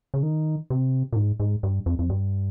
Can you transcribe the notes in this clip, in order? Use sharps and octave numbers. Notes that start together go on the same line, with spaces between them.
C#3
D#3
C3
A#2
G#2
G#2
G2
F2
F2
G2